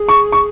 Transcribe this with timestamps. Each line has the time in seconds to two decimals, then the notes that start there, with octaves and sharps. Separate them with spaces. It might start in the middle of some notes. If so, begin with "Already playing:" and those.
Already playing: G#4
0.09 C#6
0.32 C#6